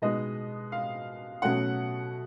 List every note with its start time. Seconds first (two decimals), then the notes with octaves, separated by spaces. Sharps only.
0.02 B2 G#3 B3 D#4 D#5
0.72 F5
1.42 B2 F#3 A3 C#4 F#5